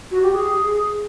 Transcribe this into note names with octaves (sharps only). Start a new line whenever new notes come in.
F#4
G4
G#4